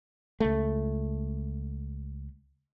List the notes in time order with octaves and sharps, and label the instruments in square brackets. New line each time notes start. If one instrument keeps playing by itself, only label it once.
[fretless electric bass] C#2 A3